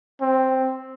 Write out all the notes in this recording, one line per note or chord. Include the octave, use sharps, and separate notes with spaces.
C4